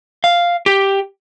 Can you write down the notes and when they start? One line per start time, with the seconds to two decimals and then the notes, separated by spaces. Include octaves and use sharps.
0.24 F5
0.66 G4